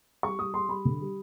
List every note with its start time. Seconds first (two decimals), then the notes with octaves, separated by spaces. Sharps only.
0.23 G3 C#6
0.39 G3 D#6
0.54 G3 C6
0.69 G3 B5
0.85 D3
1.00 G3